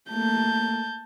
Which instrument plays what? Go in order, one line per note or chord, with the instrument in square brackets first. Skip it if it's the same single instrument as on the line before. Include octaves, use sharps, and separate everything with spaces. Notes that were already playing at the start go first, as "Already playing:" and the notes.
[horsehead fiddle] A3 A#3 [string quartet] A5 G6